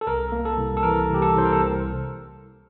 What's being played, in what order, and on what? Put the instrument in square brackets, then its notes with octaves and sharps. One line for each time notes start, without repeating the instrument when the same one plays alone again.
[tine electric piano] A4
C2 A#4
A#3
A4
C2
A4
E3 A#4
C2
G4
A4
C2 C5
A#4
A4